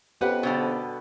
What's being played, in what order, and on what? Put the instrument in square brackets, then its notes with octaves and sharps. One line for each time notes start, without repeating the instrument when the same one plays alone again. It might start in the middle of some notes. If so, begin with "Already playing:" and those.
[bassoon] F2 [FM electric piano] B3 C#4 [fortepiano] G4 B4 F#5
[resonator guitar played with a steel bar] B2 D3 G3